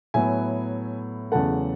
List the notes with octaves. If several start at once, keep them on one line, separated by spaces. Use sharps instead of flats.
A2 F#3 B3 E5 G#5
E2 C#3 F#3 A3 F#5 A5